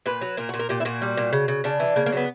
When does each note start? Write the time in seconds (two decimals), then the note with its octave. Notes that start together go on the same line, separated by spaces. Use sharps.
0.06 A#2 B4
0.21 F#3
0.37 A#2 A#4
0.49 A#2 F#4
0.59 A#4
0.69 A#2 G4
0.80 E4
0.85 A#2 F#4
1.02 G3
1.17 A#2
1.33 C#3
1.48 C#3
1.64 C#3 D4
1.80 E3
1.96 C#3 A#3
2.06 A#3
2.12 F#3 B3